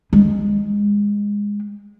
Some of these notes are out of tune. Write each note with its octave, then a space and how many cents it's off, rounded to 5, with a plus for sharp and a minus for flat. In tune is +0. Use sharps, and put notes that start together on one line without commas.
G#3 -20